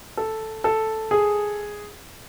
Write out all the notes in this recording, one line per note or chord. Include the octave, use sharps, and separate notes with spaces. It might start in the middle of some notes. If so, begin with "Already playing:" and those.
A4
A4
G#4